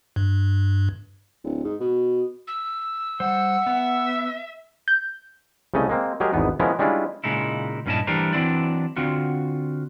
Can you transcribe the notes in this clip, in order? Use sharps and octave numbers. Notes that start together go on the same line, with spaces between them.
G2
D1
G#2
B2
E6
G3 C5 F#5
B3 E5
G6
C2 C#3 A3 C#4 D#5
G#3 A#3 C4
F#3 G#3 G4 G#4 A#4
G#1 E2 B3 D#4
F3 G#3 B3 C#4 E4 A#4
G3 G#3 C#4 D4 E4 F4
A#2 C#3 G#3 D#4 E4
G2 A#2 C#4 E4 D#5 A5
E3 G3 A3 D4 A#4 C5
E3 F#3 C4 D4 E4 D5
D3 C4 F4 F#4